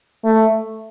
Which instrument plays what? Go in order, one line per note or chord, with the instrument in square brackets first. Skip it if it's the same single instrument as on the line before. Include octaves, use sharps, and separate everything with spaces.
[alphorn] A3